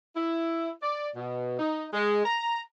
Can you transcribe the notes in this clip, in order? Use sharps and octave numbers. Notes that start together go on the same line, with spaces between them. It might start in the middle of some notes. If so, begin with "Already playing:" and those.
E4
D5
B2
D#4
G#3
A#5